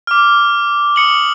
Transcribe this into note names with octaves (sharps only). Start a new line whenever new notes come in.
D6 F6
D#6 C#7 F#7